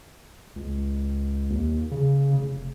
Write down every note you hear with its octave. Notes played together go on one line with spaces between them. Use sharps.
C#2
D#2
C#3
F1